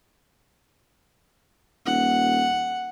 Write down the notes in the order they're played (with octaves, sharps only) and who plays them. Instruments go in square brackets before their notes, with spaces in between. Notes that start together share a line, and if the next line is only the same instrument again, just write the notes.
[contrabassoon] D#1 [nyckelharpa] F#5